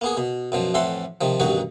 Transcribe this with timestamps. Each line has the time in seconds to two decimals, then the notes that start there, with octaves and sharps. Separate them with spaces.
0.01 A#3 B3 G#4
0.17 B2
0.52 F#2 B2 F3
0.74 F2 A2 E3 A4 F#5 C6
1.21 C3 D#3 F3
1.40 A1 G2 B2 D#3 D#4 F#4